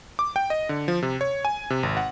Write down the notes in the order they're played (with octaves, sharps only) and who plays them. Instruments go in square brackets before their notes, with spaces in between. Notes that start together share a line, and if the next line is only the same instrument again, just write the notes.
[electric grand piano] D6
G5
D#5
D3
F3
C3
C#5
G#5
C3
G#1
F#5